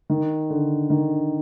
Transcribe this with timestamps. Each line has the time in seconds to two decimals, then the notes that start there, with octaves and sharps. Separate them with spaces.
0.10 D#3
0.50 D3
0.90 D#3